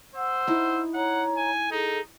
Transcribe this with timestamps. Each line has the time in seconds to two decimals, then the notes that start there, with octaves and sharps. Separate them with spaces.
0.15 C5 F#5 E6
0.47 D#4 E4
0.94 C#5 F#5 A#5
1.37 G#5
1.71 D#4 G#4 A4